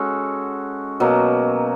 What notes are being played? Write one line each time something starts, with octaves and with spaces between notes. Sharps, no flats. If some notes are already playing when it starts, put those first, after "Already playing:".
Already playing: G#3 C#4 F#4 A4
B2 F#3 A#3